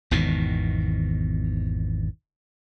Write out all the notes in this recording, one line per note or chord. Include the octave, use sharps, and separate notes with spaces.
G#1 E2 B2 D#3